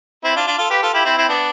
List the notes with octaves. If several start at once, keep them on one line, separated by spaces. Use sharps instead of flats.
C4 E4
D4 F4
D4 F4
F4 A4
G4 B4
F4 A4
E4 G4
C4 E4
C4 E4
B3 D4